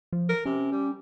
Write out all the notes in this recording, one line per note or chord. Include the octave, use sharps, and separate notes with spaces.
F3
A#4
C3 C#4
G3